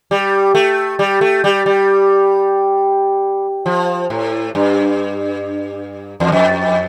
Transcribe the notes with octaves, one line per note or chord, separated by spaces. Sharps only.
G3
A3
G3
A3
G3
G3
F3
A2
G2
E2
F2